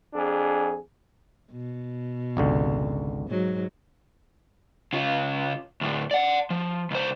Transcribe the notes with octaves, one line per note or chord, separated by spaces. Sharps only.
F2 D4 G#4
B2
G#1 C#2 D3
G#2 F#3
C#3 F4
D2 A2
D5 F#5
F3
C#2 C5